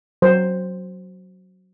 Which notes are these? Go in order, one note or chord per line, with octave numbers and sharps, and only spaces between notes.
F#3 C5